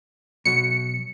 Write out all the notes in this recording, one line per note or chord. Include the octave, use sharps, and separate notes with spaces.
B2 F#3 C#7